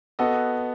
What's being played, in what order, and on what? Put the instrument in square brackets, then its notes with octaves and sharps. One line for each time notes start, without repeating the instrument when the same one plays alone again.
[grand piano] B3 F#4 A4 D#5